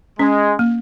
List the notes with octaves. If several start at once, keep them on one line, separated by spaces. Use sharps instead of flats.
G#3 C#4
A#3